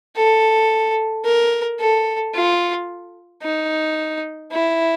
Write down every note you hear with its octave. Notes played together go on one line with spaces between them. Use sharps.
A4
A#4
A4
F4
D#4
E4